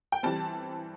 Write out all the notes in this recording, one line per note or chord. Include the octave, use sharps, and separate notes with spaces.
G5
E3 G3 C4 A5